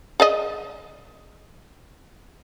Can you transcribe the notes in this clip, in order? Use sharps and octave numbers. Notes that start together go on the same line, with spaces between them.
G#4 D5 D#5